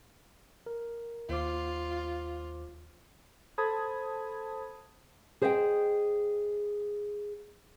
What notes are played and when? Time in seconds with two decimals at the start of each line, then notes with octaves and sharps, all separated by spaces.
0.66 A#4
1.29 D#2 F4 C5 D6
3.58 A4 C5 A5 B5 D#6 G#6
5.42 G#4 C5 D#5 E5 G5